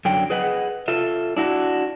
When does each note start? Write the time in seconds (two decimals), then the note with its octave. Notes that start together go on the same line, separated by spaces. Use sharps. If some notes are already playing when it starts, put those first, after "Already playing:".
0.05 F#2 D3 F#3 G5
0.30 G#4 B4 D#5 F#5
0.88 F4 A4 E5
1.37 D4 E4 F#4